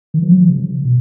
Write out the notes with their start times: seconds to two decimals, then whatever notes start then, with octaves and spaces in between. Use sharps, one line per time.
0.14 D#3
0.23 F3
0.31 F#3
0.40 F3
0.49 C#3
0.84 B2